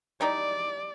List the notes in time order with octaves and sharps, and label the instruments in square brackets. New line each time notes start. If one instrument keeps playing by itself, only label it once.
[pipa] G3 D#4 E4 [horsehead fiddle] D5